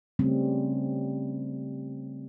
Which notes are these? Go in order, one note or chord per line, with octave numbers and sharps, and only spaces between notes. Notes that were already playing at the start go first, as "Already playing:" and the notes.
C#3 G3 A3 C4 C#4